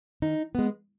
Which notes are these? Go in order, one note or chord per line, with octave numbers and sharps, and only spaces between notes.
D#3 D#4
G#3 B3